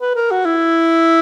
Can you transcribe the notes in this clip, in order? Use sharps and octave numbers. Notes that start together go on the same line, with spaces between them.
B4
A#4
F#4
E4